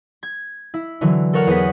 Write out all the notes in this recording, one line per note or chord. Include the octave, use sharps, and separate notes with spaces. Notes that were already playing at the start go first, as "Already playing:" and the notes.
G#6
E4
D3 E3 F#3
A4 A#4 C#5 F#5 F6
E2 B3 G#4 F#5 B6